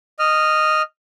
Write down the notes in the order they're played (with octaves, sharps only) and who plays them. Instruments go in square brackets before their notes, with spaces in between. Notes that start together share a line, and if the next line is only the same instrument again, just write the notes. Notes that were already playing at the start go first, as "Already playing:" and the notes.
[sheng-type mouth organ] D#5 F6